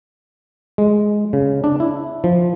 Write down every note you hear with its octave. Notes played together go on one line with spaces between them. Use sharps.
G#3
C#3
D4
E4
F3